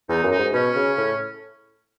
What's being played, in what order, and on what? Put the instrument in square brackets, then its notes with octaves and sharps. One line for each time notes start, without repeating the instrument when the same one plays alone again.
[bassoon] E2 [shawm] D#4
[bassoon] F#2
[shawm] D#4
[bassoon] G#2
[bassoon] B2 [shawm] C#4
[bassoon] C#3
A2